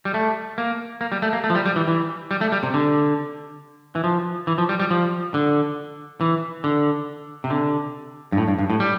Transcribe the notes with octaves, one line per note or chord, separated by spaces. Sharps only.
G3
A3
A#3
A#3
G3
A3
A#3
A3
F3
G3
G3
E3
E3
G3
A3
G3
C3
D3
E3
F3
E3
F3
G3
G3
F3
D3
E3
D3
C3
D3
G2
A2
G2
G2
A2
G3